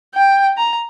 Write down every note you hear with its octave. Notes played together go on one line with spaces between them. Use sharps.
G5
A#5